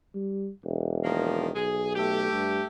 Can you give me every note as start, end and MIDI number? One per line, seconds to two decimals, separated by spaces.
0.15 0.49 55
0.65 1.51 28
1.04 1.48 51
1.04 1.48 53
1.04 1.48 58
1.55 2.28 35
1.55 1.93 68
1.95 2.66 57
1.95 2.66 67
2.33 2.60 43